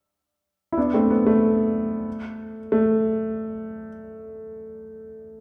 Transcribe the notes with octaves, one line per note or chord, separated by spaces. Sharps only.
E4
B3 D4
A3 C4
B3
A3
A3